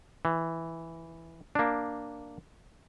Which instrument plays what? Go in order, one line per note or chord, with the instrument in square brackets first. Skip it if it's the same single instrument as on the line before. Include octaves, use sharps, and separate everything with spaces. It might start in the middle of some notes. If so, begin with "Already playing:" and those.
[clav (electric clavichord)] E3
A#3 D4